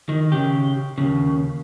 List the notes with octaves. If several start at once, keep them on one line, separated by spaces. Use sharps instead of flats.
D#3
C#3 G4
D#2 C#3